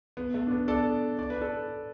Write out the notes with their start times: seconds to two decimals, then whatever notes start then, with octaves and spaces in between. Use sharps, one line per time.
0.17 B3
0.34 A3
0.47 D4
0.51 B3
0.68 A4 D5
1.19 D5
1.30 B4
1.41 A4 D5